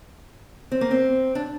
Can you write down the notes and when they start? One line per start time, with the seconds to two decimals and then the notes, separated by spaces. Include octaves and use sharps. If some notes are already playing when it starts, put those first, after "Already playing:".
0.72 C4
0.81 A#3
0.91 C4
1.35 D4